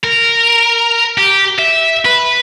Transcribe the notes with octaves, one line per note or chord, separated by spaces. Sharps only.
A#4
G4
E5
B4